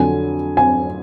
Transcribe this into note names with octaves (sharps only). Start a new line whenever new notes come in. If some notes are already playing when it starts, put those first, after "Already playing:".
Already playing: F2 D3 F#3 G#5
G#5